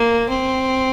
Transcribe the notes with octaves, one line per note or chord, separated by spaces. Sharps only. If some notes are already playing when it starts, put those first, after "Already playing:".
Already playing: A#3
C4